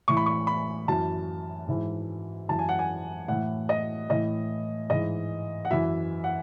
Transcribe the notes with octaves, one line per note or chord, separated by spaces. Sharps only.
A2 E3 C#6
B5
C#6
B5
F#2 E3 A5
G#2 E3
F#2 E3 A5
G#5
F#5
G#5
A2 E3 F#5
D#5
A2 E3 D#5
G#2 E3 D#5
F#5
F#2 E3 E5
F#5